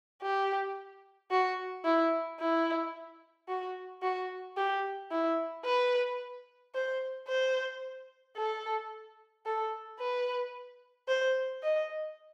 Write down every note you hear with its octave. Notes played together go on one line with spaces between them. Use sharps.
G4
F#4
E4
E4
F#4
F#4
G4
E4
B4
C5
C5
A4
A4
B4
C5
D#5